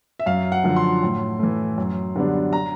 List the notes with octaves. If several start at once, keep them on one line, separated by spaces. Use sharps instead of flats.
E5
F#2 F5
F#5
D3 F3
C6
A2
E3 A3
F#2
D3 G3 B3 D4
A#5